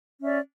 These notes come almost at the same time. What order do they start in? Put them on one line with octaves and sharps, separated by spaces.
C#4 E5 D5